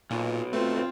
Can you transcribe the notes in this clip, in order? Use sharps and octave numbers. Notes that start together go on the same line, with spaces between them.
B1 A#2 F4
A3 C4 F4 B4